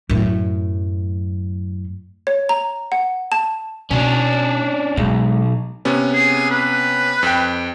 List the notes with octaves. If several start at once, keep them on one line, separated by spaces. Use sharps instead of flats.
F#2 A2
C#5
A#5
F#5
A5
B2 C#4 D4
B1 G#3
C3 B3 C#4
G#4
B4
F2 G5